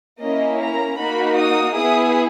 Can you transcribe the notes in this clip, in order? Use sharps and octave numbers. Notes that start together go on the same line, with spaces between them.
A#3 C#4 E4 D#5
A#5
A#3 D#4 F#4 B5
D#6
B3 E4 G#4 D#6